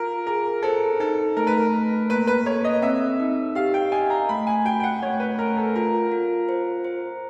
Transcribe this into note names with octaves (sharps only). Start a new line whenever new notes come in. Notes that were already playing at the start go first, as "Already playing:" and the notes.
Already playing: F4 A#4
G#4 A#4
A4 C5
D#4 A4
A3 A#4
B4
A#4
A3
A#3 B4
B4
A4 C#5
D#5
C4 E5
D#4
G4 F5
G5
D#5 G#5
A#5
A3 B5
G#5
F#4 G5
G5
F#5
A3 C#5
B4
A3 A#4
A4
F4 A#4
F4
C5
C5